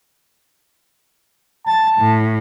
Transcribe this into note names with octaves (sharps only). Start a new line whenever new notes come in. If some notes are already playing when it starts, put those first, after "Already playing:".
A5 A6
A2